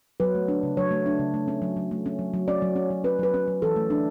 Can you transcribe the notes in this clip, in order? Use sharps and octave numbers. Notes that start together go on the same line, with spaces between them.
F#3 B4
A3
D4
C#3
F#3 C#5
A3
D4
C#3
A3
C#4
F#3
F#3
A3
C#4
F#3
F#3
C#4 D5
F#3
C#4
F#3
C#4 B4
F#3 B4
C#4
F#3
E3 A4
A3
D4